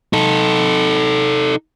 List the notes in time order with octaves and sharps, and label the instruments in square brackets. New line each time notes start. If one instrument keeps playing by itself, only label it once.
[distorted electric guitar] D#4 A4